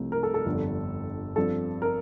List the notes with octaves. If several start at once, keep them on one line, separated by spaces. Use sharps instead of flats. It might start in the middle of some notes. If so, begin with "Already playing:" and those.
Already playing: C2 C3 F3 A3 C4
A#4
A4
A4
G1 F2 D3
G2 F3 C4 A4
A#4